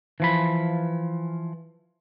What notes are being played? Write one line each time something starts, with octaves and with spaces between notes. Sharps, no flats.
E3 F3 B5